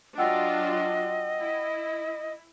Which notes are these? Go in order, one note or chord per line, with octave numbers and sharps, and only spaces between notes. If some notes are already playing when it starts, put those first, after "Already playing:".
F#3 D4 F4 D#5 F#5 G5 E6
E4